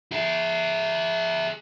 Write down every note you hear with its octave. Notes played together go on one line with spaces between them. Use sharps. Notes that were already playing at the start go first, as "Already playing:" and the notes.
G#4 E5